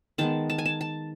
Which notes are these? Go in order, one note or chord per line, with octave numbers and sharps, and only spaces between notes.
D#3 G#3 B3 A5
A5
G#5
A5
A5